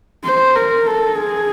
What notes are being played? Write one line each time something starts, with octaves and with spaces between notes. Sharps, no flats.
C5
A#4
A4
G#4